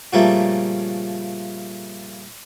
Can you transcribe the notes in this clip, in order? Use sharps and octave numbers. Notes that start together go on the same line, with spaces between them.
A#2 C#3 F3 G3 A3 A#3